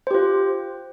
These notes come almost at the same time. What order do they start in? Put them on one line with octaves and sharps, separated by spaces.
C5 G4 F4